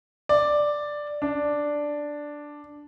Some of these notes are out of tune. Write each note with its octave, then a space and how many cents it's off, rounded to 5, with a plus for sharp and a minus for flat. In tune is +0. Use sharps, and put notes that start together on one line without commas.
D5 +5
D4 +0